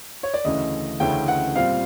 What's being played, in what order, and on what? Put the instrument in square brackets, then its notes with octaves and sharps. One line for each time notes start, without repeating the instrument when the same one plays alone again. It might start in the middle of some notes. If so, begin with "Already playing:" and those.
[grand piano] C#5
D5
D2 C#3 E3 A3 C#4 D#5
D2 C#3 E3 A3 C#4 G5
F#5
A#2 G3 C4 F5